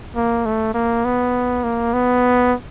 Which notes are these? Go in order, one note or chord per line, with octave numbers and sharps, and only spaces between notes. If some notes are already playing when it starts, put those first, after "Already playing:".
A#3
A3
A#3
B3
A#3
B3